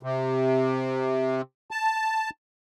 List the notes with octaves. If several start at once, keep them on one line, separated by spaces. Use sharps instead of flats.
C3
A5